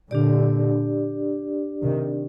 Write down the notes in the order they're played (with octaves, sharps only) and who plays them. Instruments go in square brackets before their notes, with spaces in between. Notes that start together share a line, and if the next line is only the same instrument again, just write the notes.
[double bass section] A#2 D3 [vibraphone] D4 G4 D5
[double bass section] C3 D#3